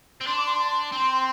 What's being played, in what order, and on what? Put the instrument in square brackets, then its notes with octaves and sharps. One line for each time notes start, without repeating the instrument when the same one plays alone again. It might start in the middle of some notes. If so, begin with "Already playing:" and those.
[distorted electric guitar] C4
[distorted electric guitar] D4 [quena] C6
[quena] D6
C6
C6
[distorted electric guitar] C4